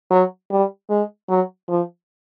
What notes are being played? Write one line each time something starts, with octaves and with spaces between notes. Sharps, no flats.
F#3
G3
G#3
F#3
F3